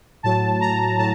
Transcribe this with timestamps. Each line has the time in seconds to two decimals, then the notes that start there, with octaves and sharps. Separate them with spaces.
0.23 A2 F#3 A5
0.60 A#5
0.98 A2 F#3 A5